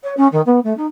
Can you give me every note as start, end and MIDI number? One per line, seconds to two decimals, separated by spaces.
0.03 0.13 73
0.17 0.27 61
0.31 0.41 51
0.45 0.59 59
0.63 0.75 57
0.77 0.85 63